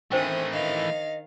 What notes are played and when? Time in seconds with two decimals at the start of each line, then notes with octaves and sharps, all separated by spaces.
0.12 D#3 E3 A3 C4 D4 C5 G5 D#6
0.52 D#3 D#5 F5 A6